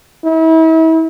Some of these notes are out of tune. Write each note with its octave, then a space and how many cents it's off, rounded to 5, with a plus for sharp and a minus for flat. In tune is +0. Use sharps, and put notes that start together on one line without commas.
E4 -35